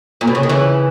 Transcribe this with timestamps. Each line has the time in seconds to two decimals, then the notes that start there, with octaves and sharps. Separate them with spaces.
0.21 A#2
0.27 B2
0.35 C#3
0.43 D#3
0.49 C#3 E3